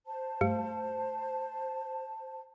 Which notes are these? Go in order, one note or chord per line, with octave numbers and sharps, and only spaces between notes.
C5 A5
G2 A3